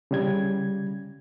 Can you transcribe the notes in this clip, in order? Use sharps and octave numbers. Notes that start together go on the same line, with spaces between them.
C#3 G3 G#6